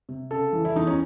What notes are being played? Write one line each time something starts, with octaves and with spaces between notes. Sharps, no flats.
C3
C#3 A4
E3
E4
E2 D#4
C#4